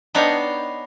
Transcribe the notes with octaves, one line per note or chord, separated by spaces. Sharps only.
B3 D4 D#4 C#5 F5 G5